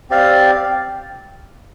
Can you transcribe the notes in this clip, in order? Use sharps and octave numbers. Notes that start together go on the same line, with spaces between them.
C4 G4 D5 F5